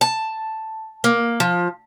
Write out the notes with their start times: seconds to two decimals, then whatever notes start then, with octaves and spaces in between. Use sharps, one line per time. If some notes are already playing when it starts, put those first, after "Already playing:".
0.01 A5
1.04 A#3
1.40 F3